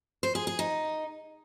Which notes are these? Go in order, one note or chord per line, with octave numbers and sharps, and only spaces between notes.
C5
G#4
G#4
D#4